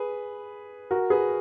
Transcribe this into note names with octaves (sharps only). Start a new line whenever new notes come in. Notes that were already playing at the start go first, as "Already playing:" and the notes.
Already playing: G#4 B4
F#4 A#4
G#4 B4